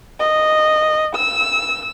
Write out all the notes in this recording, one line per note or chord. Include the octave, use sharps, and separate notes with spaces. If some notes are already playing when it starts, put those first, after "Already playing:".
D#5
E6